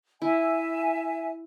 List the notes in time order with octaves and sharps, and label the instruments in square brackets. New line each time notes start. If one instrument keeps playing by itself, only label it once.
[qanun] E4 [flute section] E5 G#5